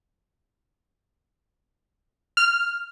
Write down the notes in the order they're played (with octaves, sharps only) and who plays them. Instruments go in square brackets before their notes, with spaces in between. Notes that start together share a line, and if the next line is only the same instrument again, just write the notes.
[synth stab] F6